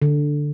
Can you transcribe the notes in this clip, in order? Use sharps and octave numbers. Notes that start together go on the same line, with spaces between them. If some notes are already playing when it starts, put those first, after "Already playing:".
D3